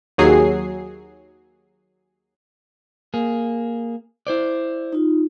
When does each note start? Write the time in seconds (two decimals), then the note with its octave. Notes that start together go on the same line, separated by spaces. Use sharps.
0.18 D#2 F#3 G#4 C7
3.14 A#3 G#4
4.27 E4 C5 D5
4.92 D#4 F4